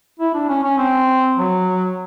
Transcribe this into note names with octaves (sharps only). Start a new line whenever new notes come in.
E4
D4
C#4
C#4
C4
F#3